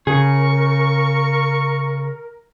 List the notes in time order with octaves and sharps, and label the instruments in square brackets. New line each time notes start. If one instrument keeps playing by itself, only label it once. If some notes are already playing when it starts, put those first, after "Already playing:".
[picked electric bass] C#3 [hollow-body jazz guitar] G#4 [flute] A#4 [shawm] C#6